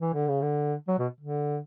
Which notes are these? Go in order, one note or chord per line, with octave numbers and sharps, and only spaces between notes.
E3
D3
C#3
D3
F#3
B2
D3